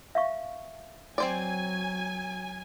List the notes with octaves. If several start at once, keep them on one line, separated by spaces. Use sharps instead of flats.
E5 F5 C#6
F#3 C4 C5 D5 G#5